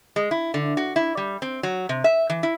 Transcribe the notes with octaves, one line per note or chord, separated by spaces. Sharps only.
G#3
E4
D3
F#4
E4
G3
C4
F#3
C3
E5
E3
E4